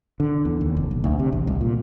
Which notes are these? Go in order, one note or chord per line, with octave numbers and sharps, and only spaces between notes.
D3
E2
D#2
F1
B1
D2
C3
A1
C2
A#2